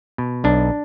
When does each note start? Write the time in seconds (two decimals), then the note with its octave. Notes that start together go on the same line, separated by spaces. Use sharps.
0.18 B2
0.44 B1 D4